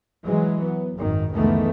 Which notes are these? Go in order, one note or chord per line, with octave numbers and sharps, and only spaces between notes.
E3 F#3 G#3
B3
G#1 F#2 D#3
C#2 F#2 D#3 E3 A3 B3